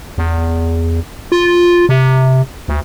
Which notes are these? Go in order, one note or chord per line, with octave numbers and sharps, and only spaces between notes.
E2
F4
C3
D2